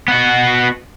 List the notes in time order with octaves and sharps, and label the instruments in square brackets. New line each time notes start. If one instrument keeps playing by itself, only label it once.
[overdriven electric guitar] B3 F#4